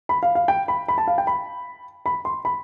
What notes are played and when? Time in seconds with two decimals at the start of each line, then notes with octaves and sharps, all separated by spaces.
0.09 B5
0.23 F5
0.35 F5
0.48 G5
0.68 B5
0.88 B5
0.98 A5
1.08 F5
1.18 G5
1.27 B5
2.06 B5
2.25 C6
2.45 B5